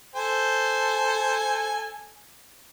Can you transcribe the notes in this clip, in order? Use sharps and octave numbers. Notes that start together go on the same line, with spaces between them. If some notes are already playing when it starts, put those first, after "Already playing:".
A4 C5 G#5